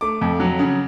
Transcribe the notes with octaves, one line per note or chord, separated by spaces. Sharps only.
A3 D6
F2
F#3
C#3